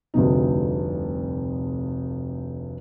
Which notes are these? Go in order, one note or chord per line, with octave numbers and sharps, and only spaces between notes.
F1 D2 G2 C3 D#4